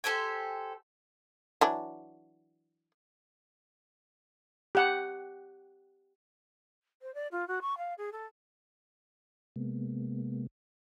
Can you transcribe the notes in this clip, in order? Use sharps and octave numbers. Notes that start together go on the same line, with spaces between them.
G4 A4 C5 G#5
E3 F#3 D4
G4 F#5
C5
D5
F4
F#4
C#6
F5
G#4
A4
C3 G#3 A#3 B3